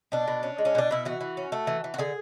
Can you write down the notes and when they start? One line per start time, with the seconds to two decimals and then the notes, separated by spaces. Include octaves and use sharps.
0.12 B2 D4
0.28 B2
0.43 C#4
0.58 G#3
0.65 C#4
0.75 B2 D4
0.91 B2 E4
1.05 E3 F#4
1.21 E3
1.37 C#4
1.52 A3
1.67 E3
1.84 E3
1.94 F#4
1.98 D3 G#4